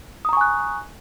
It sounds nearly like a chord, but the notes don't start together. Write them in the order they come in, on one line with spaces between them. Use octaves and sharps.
D#6 A#5 C#6 G#5 F#6